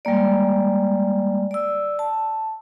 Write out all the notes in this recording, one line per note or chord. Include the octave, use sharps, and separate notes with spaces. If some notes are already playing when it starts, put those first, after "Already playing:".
G3 G#3 A#3 D5
D5 E6
A5